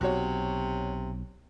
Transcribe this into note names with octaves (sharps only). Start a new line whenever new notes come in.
B1 C3 F#4 C#5